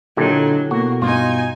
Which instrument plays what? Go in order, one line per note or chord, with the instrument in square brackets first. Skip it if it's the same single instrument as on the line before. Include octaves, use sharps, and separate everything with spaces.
[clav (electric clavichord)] A#2 D#4 [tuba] D3 [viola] F#3 [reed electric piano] E4 G4 A4
[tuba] B2 [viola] A#3 [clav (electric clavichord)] F#4
[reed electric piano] G2 [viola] D#4 G#5 [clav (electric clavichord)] F4